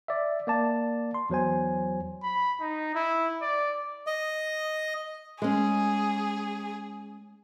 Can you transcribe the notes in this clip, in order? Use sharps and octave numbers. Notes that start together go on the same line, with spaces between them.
D5 E5
A#3 D5 A5
C6
E2 F#3 C5 G#5
B5
D#4
E4
D5
D#5
G#3 C#4 G#4